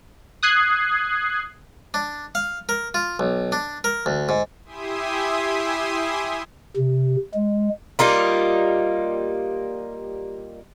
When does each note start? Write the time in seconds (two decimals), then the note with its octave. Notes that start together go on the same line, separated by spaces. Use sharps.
0.43 D#6 F#6 G#6 C7
1.94 D4
2.35 F5
2.69 A#4
2.94 F4
3.19 B1
3.52 D4
3.84 A#4
4.06 D2
4.29 G#2
4.65 E4 G4 E5 G#5 C6 D#6
6.77 C3
7.34 G#3
7.99 G3 A#3 D#4 F4